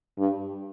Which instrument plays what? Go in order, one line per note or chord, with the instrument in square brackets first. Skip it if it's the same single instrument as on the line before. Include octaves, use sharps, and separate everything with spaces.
[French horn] G2